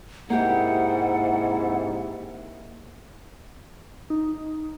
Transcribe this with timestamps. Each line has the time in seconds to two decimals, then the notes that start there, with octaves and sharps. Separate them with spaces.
0.30 G#2 C3 A#3 E4 G4 F#5
4.10 D#4